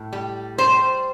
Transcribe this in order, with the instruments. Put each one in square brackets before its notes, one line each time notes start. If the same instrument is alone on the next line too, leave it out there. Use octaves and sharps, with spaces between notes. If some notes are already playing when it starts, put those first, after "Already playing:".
Already playing: [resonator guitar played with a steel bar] A2
G3
G3 C5